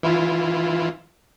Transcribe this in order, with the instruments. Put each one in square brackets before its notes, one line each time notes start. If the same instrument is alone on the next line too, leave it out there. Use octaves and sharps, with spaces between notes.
[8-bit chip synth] E3 E4 F4